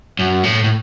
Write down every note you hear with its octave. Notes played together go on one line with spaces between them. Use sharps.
F#2
A2
A2